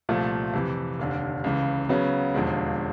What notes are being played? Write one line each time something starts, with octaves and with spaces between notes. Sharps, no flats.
C2 A#2 F3 A3
F2 C3 E3
F1 D#2 D3
C#2 C#3 E3
C#3 F#3 B3
E1 D#2 D3 F3 G#3